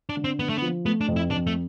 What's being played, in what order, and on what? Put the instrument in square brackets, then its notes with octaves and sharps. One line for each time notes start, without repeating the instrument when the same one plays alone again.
[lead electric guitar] D4
[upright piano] D3
[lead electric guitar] C4
[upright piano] D3 [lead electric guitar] B3
[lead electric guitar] A3
B3
[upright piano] F3
[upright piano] A3 [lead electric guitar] B3
[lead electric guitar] D4
[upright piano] F2
[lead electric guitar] E4
[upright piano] F2 [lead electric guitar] D4
[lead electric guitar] A3